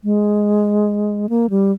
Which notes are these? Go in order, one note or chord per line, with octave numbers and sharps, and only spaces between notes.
G#3
A#3
G3